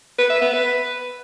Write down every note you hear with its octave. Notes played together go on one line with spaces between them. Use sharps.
B4
E5
B3
B4